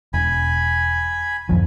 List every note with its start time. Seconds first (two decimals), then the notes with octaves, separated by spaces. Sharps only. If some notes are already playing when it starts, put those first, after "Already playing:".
0.14 E1 G#5 B5
1.49 D1 F2 F3